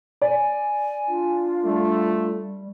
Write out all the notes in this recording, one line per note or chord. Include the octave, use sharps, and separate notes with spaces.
D5 G#5
D4 F4
G3 A3